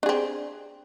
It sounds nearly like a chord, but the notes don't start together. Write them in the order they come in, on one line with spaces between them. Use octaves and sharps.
D4 G#4 C4